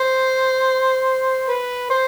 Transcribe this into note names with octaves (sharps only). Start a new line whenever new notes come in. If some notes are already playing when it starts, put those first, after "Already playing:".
Already playing: C5
B4
C5